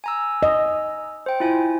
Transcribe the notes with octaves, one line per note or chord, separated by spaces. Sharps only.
G#5 A#5 E6
D#5
C5 G5
E4 F4 G#5